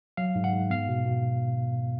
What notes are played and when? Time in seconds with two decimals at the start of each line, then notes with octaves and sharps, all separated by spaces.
0.17 F#3 F5
0.35 G#2
0.44 F#5
0.53 G#2
0.70 B3 F5
0.88 B2
1.06 B2